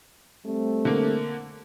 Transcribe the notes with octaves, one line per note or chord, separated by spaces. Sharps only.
G3 A3 C4
D3 A#3